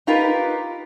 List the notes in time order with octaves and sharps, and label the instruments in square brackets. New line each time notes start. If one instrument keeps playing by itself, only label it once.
[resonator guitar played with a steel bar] D#4 F4 G4 A#4 B4